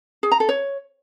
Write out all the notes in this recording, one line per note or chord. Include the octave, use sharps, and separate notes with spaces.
G#4
A#5
A4
C#5